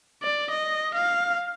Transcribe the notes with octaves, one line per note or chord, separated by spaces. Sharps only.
D5
D#5
F5